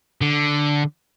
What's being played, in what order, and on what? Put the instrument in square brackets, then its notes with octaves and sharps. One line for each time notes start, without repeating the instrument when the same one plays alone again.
[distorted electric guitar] D3